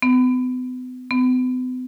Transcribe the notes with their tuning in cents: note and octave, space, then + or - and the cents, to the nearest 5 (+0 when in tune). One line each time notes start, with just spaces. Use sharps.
B3 +40
B3 +45